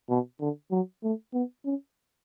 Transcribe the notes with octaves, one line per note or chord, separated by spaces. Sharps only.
B2
D3
F#3
A3
B3
C#4